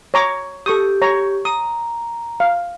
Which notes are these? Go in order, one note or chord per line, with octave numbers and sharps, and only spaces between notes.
C#5 A#5 D6
G4 A4 C#6 D#6
C#5 A#5 C#6
A#5 D#6
F5